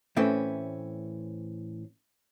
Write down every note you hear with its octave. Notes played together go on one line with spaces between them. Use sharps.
A2 E3 A3 C4 C#4